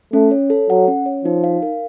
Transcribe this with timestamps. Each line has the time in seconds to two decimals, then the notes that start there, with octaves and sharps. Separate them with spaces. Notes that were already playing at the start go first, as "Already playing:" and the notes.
0.13 A3 C#4
0.31 C#5
0.50 A4
0.69 F#3 F#5
0.88 C#4
1.06 C#5
1.25 F3 D#4
1.44 F5
1.63 A#4